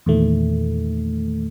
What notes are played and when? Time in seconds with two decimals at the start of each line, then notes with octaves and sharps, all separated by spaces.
0.06 E2 A#2 D#3 A3